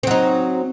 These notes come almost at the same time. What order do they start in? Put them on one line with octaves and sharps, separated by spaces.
C4 F#3 D#4